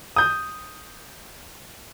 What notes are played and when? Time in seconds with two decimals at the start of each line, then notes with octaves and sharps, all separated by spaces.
0.16 D#6 G6